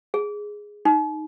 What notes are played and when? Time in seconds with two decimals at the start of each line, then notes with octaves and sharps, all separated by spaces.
0.14 G#4
0.85 D#4